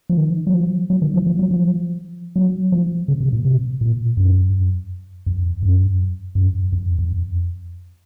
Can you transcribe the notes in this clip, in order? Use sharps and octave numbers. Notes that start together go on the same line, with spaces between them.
F3
D#3
F#3
F3
F#3
D#3
F3
F3
F#3
F3
F#3
F3
C#3
C3
A#2
C3
A#2
F#2
F2
F#2
F#2
F2
F2